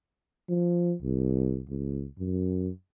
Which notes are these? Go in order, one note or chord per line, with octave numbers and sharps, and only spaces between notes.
F3
C2
C#2
F#2